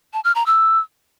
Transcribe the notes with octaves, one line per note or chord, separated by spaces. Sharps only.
A5
F6
A#5
E6